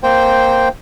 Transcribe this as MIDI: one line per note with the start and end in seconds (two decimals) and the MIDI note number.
0.03 0.69 58
0.03 0.69 72
0.03 0.69 79